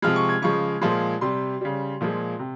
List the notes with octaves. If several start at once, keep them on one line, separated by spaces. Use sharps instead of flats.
C3 F3 G#3 F6
C#6
G#6
C#3 F3 G#3 C#6
A#2 F3 G#3 C6
C3 G3 C6
C#3 G3
A#2 F3 G#3
C3